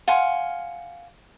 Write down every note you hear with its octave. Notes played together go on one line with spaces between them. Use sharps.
F5 F#5 G#5 C6